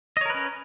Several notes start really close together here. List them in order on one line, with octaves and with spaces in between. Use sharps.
D#5 C#5 A#4 B4 C#4